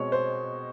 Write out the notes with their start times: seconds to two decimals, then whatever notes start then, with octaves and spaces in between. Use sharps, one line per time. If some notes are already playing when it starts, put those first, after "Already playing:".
Already playing: B2 G#3 C4 C#5
0.12 C5